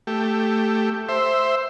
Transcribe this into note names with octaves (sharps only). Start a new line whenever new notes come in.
A3 G4
C5 E5